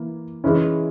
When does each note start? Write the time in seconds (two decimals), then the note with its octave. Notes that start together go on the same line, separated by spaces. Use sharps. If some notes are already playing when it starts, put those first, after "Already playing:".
Already playing: E3 A#3
0.44 E3 G#3 C#4 E4